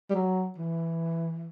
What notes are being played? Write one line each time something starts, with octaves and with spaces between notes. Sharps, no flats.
G3
F#3
E3